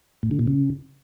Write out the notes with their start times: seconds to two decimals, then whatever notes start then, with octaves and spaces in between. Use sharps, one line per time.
0.23 A2
0.31 D3
0.39 A#2
0.47 C#3